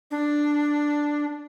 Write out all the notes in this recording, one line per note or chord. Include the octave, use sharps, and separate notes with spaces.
D4